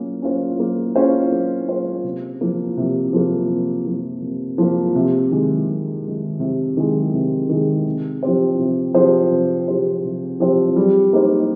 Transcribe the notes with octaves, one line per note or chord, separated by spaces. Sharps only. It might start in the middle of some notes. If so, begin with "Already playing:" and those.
Already playing: A#3 C#4 F4
C#4 F4 C5
A#3
C#4 F4 C5
A#3
C#4 F4 C5
C3
F3 A#3
C3
F3 A#3
C3
F3 A#3
C3
F3 A#3
C3
D#3 G#3
C3
D#3 G#3
C3
D#3 G#3
C3
D#3 G#3
C3
F3 C4 G4 C5
C3
F3 C4 G4 C5
C3
F3 C4 G4 C5
C3
F3 C4 G4 C5
G3
A#3 D#4 G4 C5